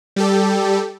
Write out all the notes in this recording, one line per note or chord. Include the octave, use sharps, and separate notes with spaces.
G3 G4 A4